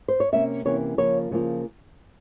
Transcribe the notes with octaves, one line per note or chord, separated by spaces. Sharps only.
C5
C#5
C3 E3 A#3 C#4 E5
C3 E3 A#3 C#4 C#5
C#3 F3 A#3 F4 C#5
C#3 F3 A#3 F4